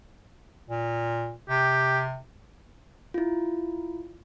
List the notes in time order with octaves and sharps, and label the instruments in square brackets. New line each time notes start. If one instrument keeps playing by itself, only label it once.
[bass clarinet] A#2
[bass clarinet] C3 [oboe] G4
[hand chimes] E4 F4